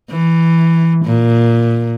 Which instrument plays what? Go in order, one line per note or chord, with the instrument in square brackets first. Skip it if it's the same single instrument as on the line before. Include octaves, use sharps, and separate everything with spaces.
[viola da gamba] E3
A#2